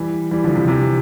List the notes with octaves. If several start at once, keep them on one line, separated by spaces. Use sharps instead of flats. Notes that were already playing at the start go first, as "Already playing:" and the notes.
Already playing: E3 G3
E3 G3
D3 F3
C3 E3
C3 E3